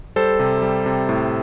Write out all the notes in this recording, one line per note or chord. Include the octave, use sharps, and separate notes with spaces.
G3 A4 C5
C3
G3
C3
A2